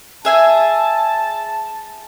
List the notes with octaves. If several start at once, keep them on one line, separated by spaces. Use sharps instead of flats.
G#4 E5 G#5 A5